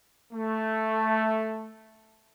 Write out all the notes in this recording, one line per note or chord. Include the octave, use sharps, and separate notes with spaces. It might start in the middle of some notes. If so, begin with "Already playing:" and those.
A3